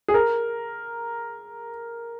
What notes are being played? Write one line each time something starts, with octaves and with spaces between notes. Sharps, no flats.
G#4
A#4